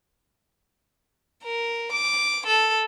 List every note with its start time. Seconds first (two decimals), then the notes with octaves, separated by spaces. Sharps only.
1.44 A#4
1.92 D6
2.47 A4